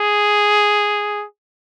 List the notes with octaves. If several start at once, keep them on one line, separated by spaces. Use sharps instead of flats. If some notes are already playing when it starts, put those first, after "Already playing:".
Already playing: G#4